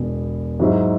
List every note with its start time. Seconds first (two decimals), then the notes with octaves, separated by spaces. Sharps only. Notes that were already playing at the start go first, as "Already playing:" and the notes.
Already playing: E1 E2 B2
0.60 G#2 F#3 E4 G#4